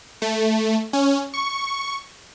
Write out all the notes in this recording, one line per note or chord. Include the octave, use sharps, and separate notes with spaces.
A3
C#4
C#6